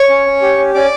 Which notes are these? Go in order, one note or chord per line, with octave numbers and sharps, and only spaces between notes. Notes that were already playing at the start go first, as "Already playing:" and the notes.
Already playing: C#5 C#6
C#4
C#4
G4
C#4
C#4 D5 D6